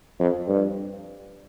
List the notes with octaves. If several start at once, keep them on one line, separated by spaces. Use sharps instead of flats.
F2
G2